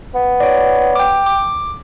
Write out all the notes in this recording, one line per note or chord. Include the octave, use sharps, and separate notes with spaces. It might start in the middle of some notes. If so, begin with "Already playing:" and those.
B3
C#5 D5
G5 D6
D6